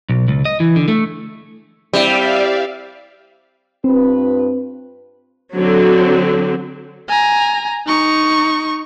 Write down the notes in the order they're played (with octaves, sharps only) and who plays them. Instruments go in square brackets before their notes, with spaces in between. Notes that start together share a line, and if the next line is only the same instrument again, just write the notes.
[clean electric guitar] B1
C#2
D#5
E3
D3
A3
[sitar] G3 [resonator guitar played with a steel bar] C4 E4 [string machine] D5 E5 F5
[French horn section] G2 F4 B4 [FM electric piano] C4
[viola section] D3 F#3 C4
[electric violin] G#5 A#5
D#4 C#6